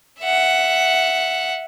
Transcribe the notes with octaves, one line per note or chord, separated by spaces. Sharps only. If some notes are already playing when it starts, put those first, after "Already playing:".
E5 F#5